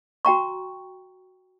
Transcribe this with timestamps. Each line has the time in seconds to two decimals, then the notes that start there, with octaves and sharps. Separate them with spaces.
0.25 F#4 G5 A#5 C#6